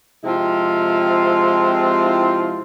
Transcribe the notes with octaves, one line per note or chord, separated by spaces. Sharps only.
C3 F3 G#3 C4 E4 F4